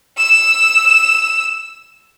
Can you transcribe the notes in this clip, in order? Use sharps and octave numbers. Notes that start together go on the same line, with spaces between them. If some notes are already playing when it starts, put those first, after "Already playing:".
E6 E7